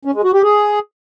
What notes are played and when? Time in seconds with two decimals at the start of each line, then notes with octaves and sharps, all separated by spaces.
0.05 C#4
0.15 G#3
0.24 F#4
0.33 G4
0.43 G#4